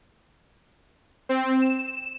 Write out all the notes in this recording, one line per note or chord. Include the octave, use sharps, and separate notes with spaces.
C4
E7